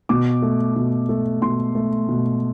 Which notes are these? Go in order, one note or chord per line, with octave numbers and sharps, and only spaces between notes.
B2 D6
A3
B2
A3
B2 C6
A3
B2